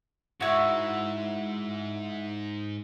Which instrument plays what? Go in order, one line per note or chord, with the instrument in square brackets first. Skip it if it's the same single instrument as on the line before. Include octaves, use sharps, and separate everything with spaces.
[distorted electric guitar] G#2 [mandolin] E4 F#4